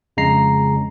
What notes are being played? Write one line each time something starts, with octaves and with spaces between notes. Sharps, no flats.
F2 C#3 G#3 A#5 C7